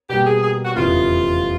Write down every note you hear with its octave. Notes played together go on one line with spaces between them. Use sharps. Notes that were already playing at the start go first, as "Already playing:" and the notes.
B2 G3 A#3 G4
G#4
G#4
F#4
F1 E2 C#3 E3 F4